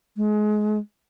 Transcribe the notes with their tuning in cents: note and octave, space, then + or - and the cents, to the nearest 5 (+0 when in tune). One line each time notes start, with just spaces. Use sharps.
G#3 +25